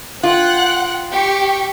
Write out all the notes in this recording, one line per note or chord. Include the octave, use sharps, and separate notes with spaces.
F4 F#5 G5 F#6
G4 C#6